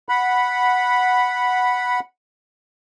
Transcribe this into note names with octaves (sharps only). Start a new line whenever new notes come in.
F#5 B5